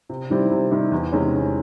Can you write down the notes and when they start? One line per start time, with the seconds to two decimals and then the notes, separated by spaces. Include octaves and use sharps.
0.09 C3
0.30 D#3 G3 C4 E4
0.51 C3
0.71 D#3 G3 C4 E4
0.92 E2
1.12 C3 D#3 G#3 C#4
1.33 E2